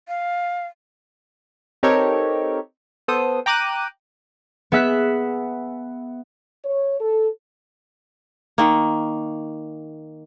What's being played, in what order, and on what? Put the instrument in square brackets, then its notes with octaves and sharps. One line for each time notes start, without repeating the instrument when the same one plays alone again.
[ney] F5
[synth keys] C4 D#4 G4 A4 A#4 C#5
B3 A4 C5 D#6
G5 A#5 D6 F#6 D#7
[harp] B3 G#4 E5 F#6 B6
[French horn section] C#5
A4
[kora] D#3 A#3